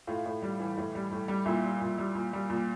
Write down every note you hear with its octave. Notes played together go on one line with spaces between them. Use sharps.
A2 F4
A2
G3
E3
A2
G3
A2
G3
A#2 E4
G3
A#2
G3
A#2
G3
A#2